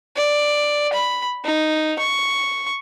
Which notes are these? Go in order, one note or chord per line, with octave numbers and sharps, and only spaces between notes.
D5
B5
D#4
C#6